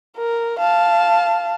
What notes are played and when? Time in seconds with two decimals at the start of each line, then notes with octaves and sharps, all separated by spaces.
0.17 A#4
0.59 F5 A5